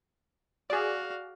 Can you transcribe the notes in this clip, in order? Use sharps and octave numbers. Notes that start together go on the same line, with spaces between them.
F#4 G#4 D5 F5